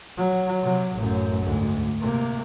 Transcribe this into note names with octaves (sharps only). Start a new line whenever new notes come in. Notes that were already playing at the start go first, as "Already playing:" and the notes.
F#3
C3 F#3
A1 F#2
D2 G#2
C3 A#3